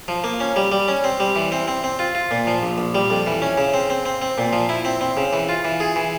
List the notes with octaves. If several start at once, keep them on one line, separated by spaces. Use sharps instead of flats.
F3
A#3
C#4
G3
G3
C#4
C4
G3
E3
C4
C4
C4
F4
F4
A#2
F3
A#1
A#1
G3
F2
E3
C#4
C#3
C4
C4
C4
C4
A#2
F3
E4
C4
C4
C#3
E3
F4
E3
G#4
E3